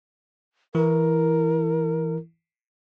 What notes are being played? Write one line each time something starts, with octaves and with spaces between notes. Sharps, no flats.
E3 E4 A#4